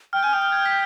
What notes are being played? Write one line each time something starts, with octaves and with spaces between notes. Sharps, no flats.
G5 F6
G#5 G6
G5 D#6
F6
G#6
B6